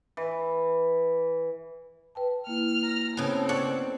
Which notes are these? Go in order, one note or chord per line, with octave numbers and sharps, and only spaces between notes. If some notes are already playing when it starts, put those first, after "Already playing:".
E3
B4 G5 A5
A#3 E4 F6
A#5
C#3 B3 C4 A4
C#5 D5 F#5